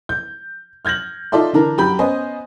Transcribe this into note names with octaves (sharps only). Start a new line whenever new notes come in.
G6
F6 G6 G#6 A#6 F#7
D#4 F4 A4 D5 E5 C6
D3 E3 D4 A#4
F#2 G4 G5 B5 G6
B3 C#4 B4 C5 D#5 G#5